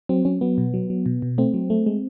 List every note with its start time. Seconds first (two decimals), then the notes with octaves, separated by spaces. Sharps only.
0.09 F#3 C4
0.25 F#3 C#4
0.41 F#3 B3
0.58 B2
0.74 F#3
0.90 F#3
1.06 B2
1.22 B2
1.38 A3 C4
1.54 F#3
1.70 A3
1.86 G#3